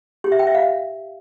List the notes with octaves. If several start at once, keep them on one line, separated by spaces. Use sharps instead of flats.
G4
E5
G5
E5
F5